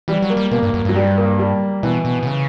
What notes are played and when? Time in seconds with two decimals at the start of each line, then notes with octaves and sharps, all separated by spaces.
0.08 E3 G3
0.23 F#3
0.30 A#3
0.37 G3
0.51 B2 A#3
0.63 G2
0.74 F#2
0.85 G2 F#3
0.96 G3
1.18 A#3
1.39 G3
1.83 B2 E3
2.05 B2
2.23 B2
2.27 C#3